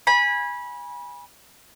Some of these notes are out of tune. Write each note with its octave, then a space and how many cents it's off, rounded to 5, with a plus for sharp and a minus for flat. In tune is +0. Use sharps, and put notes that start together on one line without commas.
G#5 -15 B5 -25